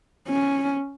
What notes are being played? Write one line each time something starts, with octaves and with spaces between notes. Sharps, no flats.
C#4